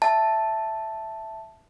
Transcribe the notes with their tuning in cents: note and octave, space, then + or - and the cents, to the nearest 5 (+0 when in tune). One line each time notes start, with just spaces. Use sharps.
E5 +0 A5 +0